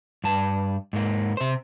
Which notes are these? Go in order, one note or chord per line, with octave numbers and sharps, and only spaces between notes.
G2 A5
G#2 A#3
C3 C5